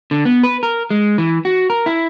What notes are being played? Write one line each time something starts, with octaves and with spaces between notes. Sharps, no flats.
D3
B3
B4
A#4
G#3
E3
F#4
A#4
E4